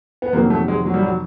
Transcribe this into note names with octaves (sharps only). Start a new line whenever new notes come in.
B3
F2 C3 D#3 F#3 A#3
A3
G#3
F#3
G3
F#3